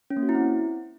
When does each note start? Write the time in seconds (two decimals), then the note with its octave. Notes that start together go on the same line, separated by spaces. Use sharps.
0.10 C#4
0.17 A#3
0.23 F#4
0.29 E4
0.35 C4